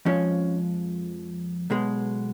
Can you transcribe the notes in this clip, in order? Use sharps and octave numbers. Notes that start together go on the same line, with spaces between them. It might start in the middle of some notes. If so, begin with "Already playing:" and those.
F2 F3 G#3 C#4
B1 B2 G#3